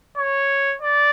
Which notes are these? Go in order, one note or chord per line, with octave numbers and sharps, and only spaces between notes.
C#5
D5